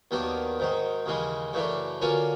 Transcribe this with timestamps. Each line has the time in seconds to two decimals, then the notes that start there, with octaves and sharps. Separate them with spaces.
0.11 D#2 D#3 F#3 B3 D4
0.59 G#2 D#3 F#3
1.06 D#2 C#3 E3 G#3
1.53 F#2 C#3 E3 A3 D4
2.01 D3 F#3 A#3 C#4 F4